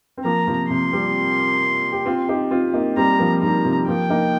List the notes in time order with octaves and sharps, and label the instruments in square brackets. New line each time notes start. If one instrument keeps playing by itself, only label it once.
[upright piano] C4
[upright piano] F3 A#3 [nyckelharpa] A#5
[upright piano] C3 F3
[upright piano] C3 [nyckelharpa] C6
[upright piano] G3 C4
G4
C4 F4
D#4 G4
C4 F4
A#3 D#4
[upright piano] G3 C4 [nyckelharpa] A#5
[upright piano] F3 A#3
[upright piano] D#3 G3 [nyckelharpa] A#5
[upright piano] C3 F3
[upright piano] F3 A#3 [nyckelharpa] G5
[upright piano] A#3 D#4